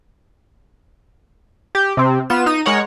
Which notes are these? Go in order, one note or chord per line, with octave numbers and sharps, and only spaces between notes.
G4
C3 C4
B3 F4 E7
D#4 D#7
G#3 A#4 C#5 F#5